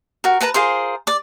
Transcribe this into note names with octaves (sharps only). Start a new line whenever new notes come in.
F#4 A#4
A#4 B4 A5 A#5
F4 G#4 A#4 C5
D5 D6